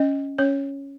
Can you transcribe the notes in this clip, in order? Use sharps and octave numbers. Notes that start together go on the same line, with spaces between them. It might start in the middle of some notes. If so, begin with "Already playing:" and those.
Already playing: C#4 D#5
C#4 C#5